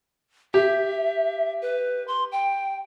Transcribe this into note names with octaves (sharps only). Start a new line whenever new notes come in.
G4 E5
B4
C6
G5